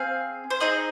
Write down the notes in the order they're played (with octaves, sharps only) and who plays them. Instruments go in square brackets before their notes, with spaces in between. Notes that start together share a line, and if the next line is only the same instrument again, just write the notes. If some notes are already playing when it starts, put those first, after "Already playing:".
Already playing: [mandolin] C4 G#4 F5
C5
C4 D#4 G#4 D#5